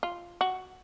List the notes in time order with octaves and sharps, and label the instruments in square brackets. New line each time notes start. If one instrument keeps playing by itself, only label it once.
[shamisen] F4
F#4